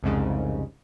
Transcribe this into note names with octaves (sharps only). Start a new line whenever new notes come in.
C2 F2 G#2 C#3